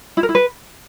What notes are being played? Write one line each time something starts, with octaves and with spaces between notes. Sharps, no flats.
E4
A#4
E4
B4